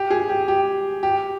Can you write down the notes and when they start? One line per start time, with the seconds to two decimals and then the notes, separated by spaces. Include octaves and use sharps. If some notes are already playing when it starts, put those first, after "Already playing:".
Already playing: G4
0.10 G#4
0.29 G4
0.48 G4
1.03 G4